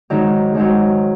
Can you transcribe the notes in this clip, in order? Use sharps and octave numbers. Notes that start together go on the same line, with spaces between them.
G#2 D#3 F#3
G#2 D#3 F#3